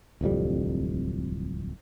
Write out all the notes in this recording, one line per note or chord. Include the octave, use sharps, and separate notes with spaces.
D1 C2 F2 G3